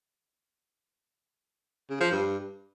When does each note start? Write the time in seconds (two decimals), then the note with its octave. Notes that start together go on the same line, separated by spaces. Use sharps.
1.90 C#3
2.01 F3
2.11 G2